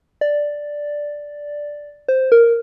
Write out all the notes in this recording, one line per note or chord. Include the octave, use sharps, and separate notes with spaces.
D5
C5
A#4